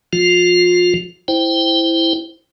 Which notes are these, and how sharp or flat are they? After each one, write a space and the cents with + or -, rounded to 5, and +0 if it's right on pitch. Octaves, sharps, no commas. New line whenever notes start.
F3 +0 F4 +35
E4 +0 C5 +0 G5 +0